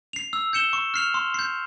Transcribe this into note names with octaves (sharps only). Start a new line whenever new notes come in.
C7 F7
E6
G6 C#7 E7 G7
C#6
F6 C7 F7
C6
G6 C7